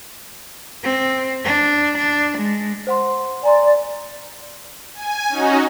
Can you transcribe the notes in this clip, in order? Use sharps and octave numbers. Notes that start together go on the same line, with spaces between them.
C4
D4
D4
G#3
C5 F#5 C6
D5 G#5 A#5 C6
G#5
C#4 D#4 F#4